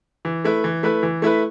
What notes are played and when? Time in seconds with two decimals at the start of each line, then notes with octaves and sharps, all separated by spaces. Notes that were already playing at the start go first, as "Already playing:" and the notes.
0.25 E3
0.45 A3 E4 B4
0.64 E3
0.83 A3 E4 B4
1.03 E3
1.22 A3 E4 B4